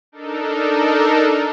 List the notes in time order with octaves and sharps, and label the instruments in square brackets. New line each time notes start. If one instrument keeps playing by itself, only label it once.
[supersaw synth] D4 D#4 A4 A#4